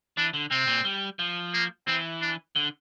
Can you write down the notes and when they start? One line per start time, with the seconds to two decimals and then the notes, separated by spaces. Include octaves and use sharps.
0.17 E3 D4
0.34 D3
0.51 C3 C4
0.68 A#2
0.85 G3
1.19 F3
1.54 A#3
1.87 E3 C4
2.22 D4
2.56 D3